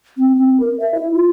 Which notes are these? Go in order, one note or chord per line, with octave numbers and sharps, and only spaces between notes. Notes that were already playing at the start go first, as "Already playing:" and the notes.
C4
C4
A#4
E5
E4
F4